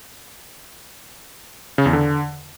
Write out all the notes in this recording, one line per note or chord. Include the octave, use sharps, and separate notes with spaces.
C#3
E2
D3